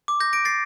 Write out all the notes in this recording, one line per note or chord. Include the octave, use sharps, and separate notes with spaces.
D6
G6 A#6
A#6 D7
A6 C7